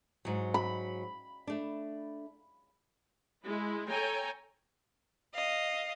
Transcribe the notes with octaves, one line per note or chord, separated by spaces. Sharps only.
G#2 F#3
B5
A3 D4
G#3 E4
A4 C#5 G5 G#5 A#5
D#5 F5